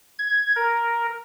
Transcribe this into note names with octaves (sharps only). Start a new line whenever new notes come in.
G#6
A#4